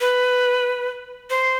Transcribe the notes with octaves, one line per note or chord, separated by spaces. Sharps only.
B4
C5